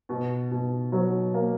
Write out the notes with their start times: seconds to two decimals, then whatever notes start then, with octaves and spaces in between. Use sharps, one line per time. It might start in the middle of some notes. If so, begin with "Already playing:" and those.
0.09 B2
0.51 B2
0.92 F#3
1.34 A#3